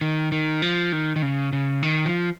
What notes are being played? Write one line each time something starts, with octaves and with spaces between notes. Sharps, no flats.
D#3
D#3
F3
D#3
D#3
C#3
C#3
D#3
F3